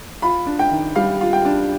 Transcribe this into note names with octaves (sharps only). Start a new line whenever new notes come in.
F4 B5
D4
G5
D#3
G3 F5
F4
G5
D4